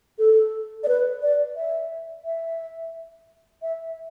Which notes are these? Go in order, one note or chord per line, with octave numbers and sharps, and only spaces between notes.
A4
D5
B4
D5
E5
E5
E5